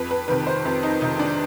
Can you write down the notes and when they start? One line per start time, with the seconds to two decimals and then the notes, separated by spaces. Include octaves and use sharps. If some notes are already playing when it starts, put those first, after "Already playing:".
Already playing: F2 B4
0.11 B4
0.28 C3 D#3 B4
0.47 C5
0.65 F2
0.83 D#4
1.01 C3 D#3 D#4
1.19 D4